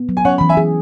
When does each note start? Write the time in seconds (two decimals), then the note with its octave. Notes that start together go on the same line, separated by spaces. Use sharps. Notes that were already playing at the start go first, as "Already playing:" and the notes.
Already playing: B3
0.09 F#3
0.17 G#5
0.25 C#4 C#5 F#5
0.38 E3 B5
0.49 E5 G#5
0.57 G#4